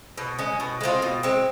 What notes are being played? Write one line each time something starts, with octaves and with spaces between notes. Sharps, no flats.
B2
G#3 C#4
B2
G#3 C4 F4
B2
G#3 C4